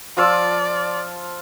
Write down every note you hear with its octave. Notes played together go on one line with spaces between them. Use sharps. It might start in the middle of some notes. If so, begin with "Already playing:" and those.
F3 F4 D5 E6